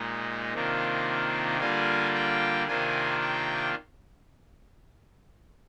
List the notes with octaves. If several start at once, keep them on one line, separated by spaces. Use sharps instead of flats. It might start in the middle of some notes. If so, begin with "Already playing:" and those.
Already playing: A#2 G#3 D#4
C3 D#3 A#3 D4 F4
D3 G3 A#3 F4 G#5
G5
C3 D#3 A#3 D4 F4 G#5
G5